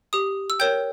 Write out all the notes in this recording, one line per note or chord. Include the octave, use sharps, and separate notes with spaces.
G4 D#6
E6
A#4 C#5 G5 G6